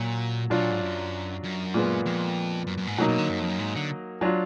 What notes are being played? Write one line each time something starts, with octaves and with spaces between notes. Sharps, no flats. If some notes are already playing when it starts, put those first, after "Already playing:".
Already playing: A#2 F#3
B2 F#3 D4 F4
A#2
G#2
F#2
F#2
A#2 G#3 B3 F4
F2
F#2
F#2
G#2
B2 F#3 A#3 D#4
B2
D3
F#2
F2
F#2
G#2
D3
F#3 D4 F4